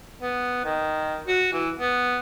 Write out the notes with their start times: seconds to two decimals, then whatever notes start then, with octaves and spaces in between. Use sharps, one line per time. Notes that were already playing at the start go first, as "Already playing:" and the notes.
0.22 B3
0.65 D#3
1.27 F#4
1.53 E3
1.78 B3